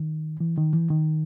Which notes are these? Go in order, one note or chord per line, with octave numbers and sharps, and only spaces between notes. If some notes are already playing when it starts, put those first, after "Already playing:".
Already playing: D#3
E3
D#3
E3
D#3